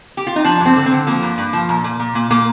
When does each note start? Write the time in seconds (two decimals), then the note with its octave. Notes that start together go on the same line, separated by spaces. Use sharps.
0.17 G4
0.27 F4
0.36 D#4
0.44 F3 D4
0.60 G2
0.66 C4
0.76 D3
0.86 C4
0.91 D3
1.07 F3 A#3
1.22 G2
1.38 G2
1.53 F3
1.69 A#2
1.84 A#2
2.00 A#2
2.15 A#2
2.30 A#2 A#3